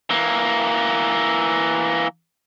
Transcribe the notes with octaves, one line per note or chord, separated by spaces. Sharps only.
E3 A#3